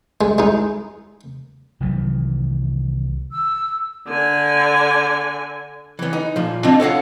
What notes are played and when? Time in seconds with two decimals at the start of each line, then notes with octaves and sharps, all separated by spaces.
0.21 G#3
0.38 G#3 D#4
1.80 C2 D#3 E3 F#3
3.31 E6
4.07 D3 G#5
5.99 E3 B3
6.13 D#4
6.36 A#2 F3
6.64 C4 D4 F4 D#5 A5
6.80 A4 C#5 F5 F#5